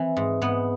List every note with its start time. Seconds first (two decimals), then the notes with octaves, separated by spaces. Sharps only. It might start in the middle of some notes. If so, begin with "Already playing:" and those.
Already playing: E3 C4
0.17 G#2
0.42 G#2 B3